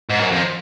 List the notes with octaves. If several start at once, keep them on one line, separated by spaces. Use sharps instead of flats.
G#2
F#2
F2